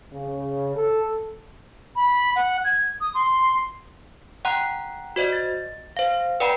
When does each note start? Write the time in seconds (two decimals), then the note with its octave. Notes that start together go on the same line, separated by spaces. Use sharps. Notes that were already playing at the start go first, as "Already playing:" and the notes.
0.12 C#3
0.76 A4
1.96 B5
2.36 F#5
2.64 G#6
3.01 D#6
3.14 C6
4.45 F#5 G5 A#5 C6 F#6
5.16 F#4 C5 D5 D#5
5.32 A6
5.97 C5 F5
6.40 B4 D5 F#5 G5 A#5 B5